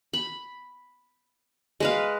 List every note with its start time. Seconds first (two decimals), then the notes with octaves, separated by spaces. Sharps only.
0.13 B5
1.80 G#3 B4 F5